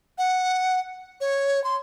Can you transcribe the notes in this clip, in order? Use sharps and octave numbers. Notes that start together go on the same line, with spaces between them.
F#5
C#5
C6